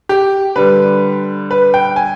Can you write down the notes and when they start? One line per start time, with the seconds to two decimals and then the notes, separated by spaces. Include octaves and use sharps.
0.09 G4
0.56 D3 G3 B4
1.51 B4
1.74 G5
1.96 G#5